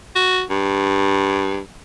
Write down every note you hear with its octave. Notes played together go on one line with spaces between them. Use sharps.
F#4
G2